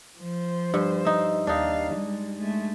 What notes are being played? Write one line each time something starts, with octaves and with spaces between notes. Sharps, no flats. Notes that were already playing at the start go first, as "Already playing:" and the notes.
F3 C5
G2
D#4 E5
D#2 D4 D#4 F5
G3 G#3
G#3 A3